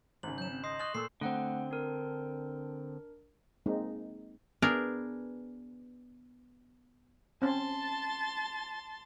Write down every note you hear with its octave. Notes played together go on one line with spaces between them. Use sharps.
G#1 C#3 F#7
F#3 G6 E7
C4
D#5 C6 D#6 C7
C#6 D#6 F#6 G6 A6 F#7
A#2 A4 C6 E6 C7
D3 A3 C4 F#5
D4 A#4
G#3 A#3 C4 D#4
B3 D4 G#4 A#4
C4 C#4 A5 C6 A6